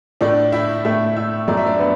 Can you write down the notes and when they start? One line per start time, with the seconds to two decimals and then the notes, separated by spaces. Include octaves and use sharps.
0.21 A2 A3 D4 D5
0.52 E4 E5
0.85 A2 A3 E4 E5
1.16 E4 E5
1.48 F#2 F#3 A3 D5
1.57 E5
1.66 D4 D5
1.79 B3 B4